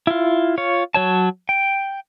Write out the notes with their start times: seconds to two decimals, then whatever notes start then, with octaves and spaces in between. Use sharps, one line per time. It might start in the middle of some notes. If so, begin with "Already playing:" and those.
0.07 E4 F4
0.58 F4 C#5
0.94 F#3 C#5 A5
1.49 G5